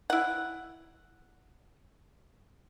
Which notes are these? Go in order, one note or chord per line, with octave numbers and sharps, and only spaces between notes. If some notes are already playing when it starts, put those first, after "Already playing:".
E4 F#5